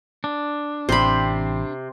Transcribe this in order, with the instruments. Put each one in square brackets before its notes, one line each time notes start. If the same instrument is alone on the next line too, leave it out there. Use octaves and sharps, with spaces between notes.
[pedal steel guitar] D4
[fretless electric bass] A1 E3 [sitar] C3 [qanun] C5 B5